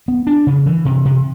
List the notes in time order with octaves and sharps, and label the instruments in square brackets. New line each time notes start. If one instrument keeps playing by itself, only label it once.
[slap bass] B3
D4
C#3
E3
C3
C3